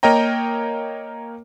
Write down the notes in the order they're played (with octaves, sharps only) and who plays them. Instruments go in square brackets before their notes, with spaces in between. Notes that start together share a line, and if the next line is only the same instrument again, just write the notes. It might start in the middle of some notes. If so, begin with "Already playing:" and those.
[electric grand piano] A#3 A#4 C#5 D#5 G5 A#5